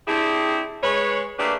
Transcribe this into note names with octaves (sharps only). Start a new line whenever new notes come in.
C4 D4 E4 G4 G#4
G#3 B4 C#5
A3 A#3 D4 G4 G#4 B4